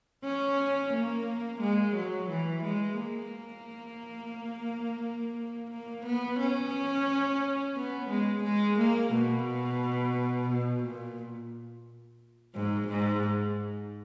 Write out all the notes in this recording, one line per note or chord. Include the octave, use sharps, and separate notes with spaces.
C#4
A#3
G#3
F#3
E3
G#3
A#3
A#3
B3
C#4
B3
G#3
G#3
A#3
B2
B2
A#2
G#2
G#2